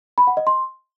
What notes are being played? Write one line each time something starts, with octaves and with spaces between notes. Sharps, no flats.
B5
F#5
D#5
C6